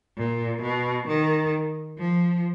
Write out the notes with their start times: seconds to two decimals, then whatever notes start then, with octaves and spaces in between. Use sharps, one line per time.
0.17 A#2
0.61 B2
1.07 D#3
1.98 F3